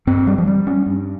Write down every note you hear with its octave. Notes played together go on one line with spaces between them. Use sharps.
G2 C4
G3
F3
G3
C#4
G2